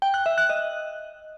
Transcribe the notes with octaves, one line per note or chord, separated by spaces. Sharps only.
G5
F#6
E5
F#6
D#5